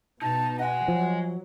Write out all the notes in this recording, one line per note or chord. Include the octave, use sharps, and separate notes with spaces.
B2 D#4 A5
D#5 F#5 G#5
F3 F#3